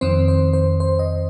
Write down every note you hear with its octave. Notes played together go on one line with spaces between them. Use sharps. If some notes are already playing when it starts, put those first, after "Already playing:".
F2 D#3 C4 C5
C5
C5
C5
D#5